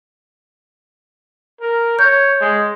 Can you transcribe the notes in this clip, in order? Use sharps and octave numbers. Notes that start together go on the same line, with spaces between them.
A#4
C#5 G6
G#3